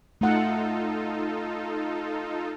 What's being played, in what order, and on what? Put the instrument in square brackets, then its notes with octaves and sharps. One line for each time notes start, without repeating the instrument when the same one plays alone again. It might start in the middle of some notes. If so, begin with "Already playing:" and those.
[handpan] A3 F#5 [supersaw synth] D#4 F4 A4